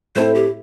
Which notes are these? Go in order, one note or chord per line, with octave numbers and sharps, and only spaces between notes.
A2 A3 C4 E4 A4 C5
G4